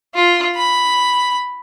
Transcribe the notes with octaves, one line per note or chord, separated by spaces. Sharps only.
F4
B5